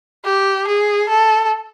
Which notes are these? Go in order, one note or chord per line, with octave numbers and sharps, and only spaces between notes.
G4
G#4
A4